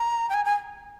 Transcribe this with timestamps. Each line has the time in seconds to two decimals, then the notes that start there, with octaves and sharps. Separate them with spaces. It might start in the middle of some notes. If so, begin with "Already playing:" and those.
Already playing: A#5
0.30 G5
0.34 G#5
0.45 G#5